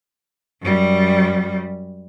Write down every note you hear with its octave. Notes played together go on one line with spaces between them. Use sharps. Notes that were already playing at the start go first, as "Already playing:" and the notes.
F#2 G3